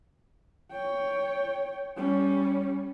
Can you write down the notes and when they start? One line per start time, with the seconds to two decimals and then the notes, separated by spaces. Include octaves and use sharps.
0.72 C#5 G5
1.97 G3 C#4